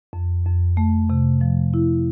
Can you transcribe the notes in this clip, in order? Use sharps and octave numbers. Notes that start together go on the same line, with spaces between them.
F2
F2
A3
C3
F3
E4